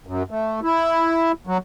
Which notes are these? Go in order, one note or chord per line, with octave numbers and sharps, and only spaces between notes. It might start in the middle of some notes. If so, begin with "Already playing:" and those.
F#2
A3
E4
F#3